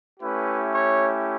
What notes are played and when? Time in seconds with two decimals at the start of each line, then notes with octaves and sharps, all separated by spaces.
0.20 A3 C#4 E4 G4 B4
0.73 C#5